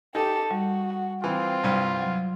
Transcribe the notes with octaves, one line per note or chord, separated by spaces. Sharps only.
D#4 G4 A4
G3 F#4
F#5
E3 C4 F4 G5 B5
C2 G2
F#3